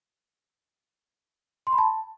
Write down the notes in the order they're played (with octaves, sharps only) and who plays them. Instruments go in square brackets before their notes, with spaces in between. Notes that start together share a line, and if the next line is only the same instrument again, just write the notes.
[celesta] C6
B5
A5